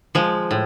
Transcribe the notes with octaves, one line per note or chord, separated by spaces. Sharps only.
F3 G#3
A2